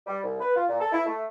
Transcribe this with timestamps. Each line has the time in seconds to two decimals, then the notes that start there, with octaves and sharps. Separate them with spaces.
0.07 G3
0.24 C2
0.40 B4
0.56 F4
0.69 A#2
0.80 A4
0.93 E4
1.06 A3